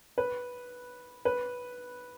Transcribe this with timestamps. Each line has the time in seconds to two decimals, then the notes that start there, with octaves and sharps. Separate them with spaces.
0.18 B4
1.25 B4